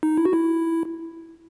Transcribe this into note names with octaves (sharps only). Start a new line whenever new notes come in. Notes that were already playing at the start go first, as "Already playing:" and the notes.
D#4
E4
F#4
E4